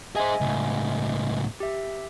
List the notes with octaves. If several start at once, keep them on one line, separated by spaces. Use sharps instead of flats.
G#4 C5 D#5 E5 G#5
C#2 A2
G4 E5